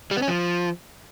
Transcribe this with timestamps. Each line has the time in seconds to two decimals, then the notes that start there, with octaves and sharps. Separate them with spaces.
0.11 G3
0.17 B3
0.22 C#4
0.28 F3